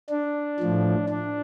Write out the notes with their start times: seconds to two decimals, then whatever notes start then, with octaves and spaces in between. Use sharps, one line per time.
0.10 D4
0.60 A2 F3
1.10 D4